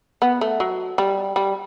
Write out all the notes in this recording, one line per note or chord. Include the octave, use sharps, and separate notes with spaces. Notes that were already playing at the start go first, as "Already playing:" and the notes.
B3
A3
F#3
G3
G3